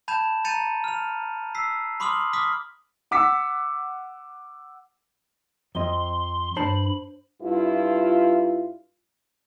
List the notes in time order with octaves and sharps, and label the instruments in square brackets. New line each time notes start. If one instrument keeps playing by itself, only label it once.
[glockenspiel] A5 B5 G6 G#6 E7
A#5 G6 A6 C#7 D#7 F7
F6 F7
E6 B6 C7
B5 C6 D6 D#6 F6 F#7
D6 D#6 F6 B6
[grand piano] F#5 D6 E6 B6 C#7
[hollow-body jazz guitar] F2 D#5 [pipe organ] C6
[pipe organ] G2 B5 [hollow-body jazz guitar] C5 A5
[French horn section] G2 E4 F4